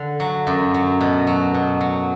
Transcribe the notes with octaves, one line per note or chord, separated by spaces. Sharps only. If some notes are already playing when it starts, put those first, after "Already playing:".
Already playing: D3
F#3
F#2
F#3
B2
F#3
B2
F#3